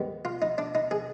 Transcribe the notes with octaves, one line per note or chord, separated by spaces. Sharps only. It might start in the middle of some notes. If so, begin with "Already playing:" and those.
Already playing: G#2 D#3 G3 B3
F4
D#4
D4
D#4
G#4